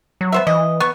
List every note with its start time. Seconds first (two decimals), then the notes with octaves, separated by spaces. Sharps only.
0.21 F#3
0.32 B3 C5 E5
0.47 E3 D#5
0.80 B3 C#6